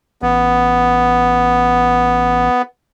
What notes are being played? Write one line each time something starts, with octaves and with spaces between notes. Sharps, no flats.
A1 B3